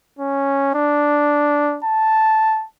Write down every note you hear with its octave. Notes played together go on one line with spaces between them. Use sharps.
C#4
D4
A5